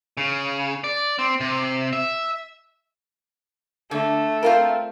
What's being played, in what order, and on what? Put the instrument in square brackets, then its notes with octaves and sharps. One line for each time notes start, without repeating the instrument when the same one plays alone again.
[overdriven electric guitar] C#3
D5
C4
C3
E5
[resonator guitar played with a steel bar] D3 [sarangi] A3
[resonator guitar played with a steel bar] C4 F4 A#4